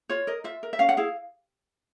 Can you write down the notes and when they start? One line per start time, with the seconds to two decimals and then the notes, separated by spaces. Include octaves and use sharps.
0.09 F4 C#5
0.27 A#4 D#5
0.44 F4 E5
0.63 A#4
0.73 E5
0.79 C#4 F5
0.89 F#5
0.97 E4 G#4 F5